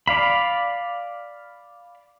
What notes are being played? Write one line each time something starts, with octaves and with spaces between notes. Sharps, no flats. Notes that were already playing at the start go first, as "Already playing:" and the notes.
D5 F5 B5